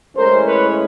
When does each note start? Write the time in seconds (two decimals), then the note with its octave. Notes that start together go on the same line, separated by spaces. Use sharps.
0.16 A2 E3 G#3 C#4 A#4 C5
0.46 B4 C#5